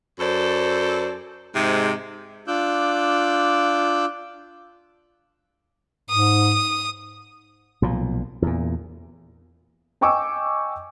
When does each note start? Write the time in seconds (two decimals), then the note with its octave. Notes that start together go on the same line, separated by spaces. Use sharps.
0.19 F#2 A4 C5 D5
1.55 G#2 C3 G#3
2.48 D4 F4 D6 E6 F#6 G6
6.10 G#2 D#6
7.82 B1 A#2 F3
8.42 E2 A#2
10.01 D#5 G5 G#5 C#6 D6 E6